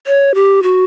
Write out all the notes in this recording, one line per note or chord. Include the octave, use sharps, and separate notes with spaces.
C#5
G4
F#4